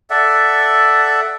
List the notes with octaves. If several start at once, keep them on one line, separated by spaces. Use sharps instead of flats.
A4 D5 E5 F#5